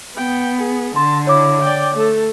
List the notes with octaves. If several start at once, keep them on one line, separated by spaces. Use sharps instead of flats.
B3 G5
G#4
D3 A5 C6
E4 C#5 D6
D5 G5
A3 A4